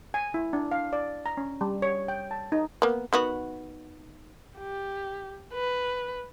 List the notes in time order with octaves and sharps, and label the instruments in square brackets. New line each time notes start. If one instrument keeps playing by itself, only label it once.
[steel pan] G#5
E4
D4
F5
D5
A#5
C#4
G3
C#5
G5
A5
D#4
[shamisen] A#3 B3
D#3 B3 F#4
[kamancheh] G4
B4